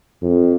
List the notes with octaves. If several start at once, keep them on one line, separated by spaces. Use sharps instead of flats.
F2